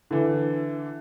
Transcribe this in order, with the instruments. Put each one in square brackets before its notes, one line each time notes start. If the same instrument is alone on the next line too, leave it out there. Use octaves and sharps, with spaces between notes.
[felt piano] D3 E3